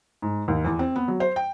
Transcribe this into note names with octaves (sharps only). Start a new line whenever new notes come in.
G#2
D#2
E2
C4
B3
F#3
C5
G5